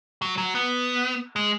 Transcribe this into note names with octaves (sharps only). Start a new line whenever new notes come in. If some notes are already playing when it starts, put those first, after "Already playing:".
F#3
F#3
B3
G#3